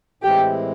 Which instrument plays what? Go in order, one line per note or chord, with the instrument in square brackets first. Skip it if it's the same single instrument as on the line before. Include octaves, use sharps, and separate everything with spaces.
[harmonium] A2 E3 G#3 C4 E4 [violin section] G4